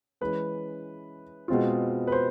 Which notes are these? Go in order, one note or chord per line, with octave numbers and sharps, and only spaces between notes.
E3 G#3 C#4 B4
B2 G#3 C4 F4
B4
C5